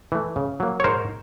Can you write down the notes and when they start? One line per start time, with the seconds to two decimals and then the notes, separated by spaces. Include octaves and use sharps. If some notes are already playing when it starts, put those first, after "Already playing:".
0.12 E3 A3
0.36 C#3
0.60 F#3 A#3
0.80 C#5
0.84 G#2 A#4 C5